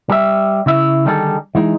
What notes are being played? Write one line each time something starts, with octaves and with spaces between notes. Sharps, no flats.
G3 E5
C#3 E4 E5
D3 D#3 G3 D#4 G#4 A4
E3 G#3 D#4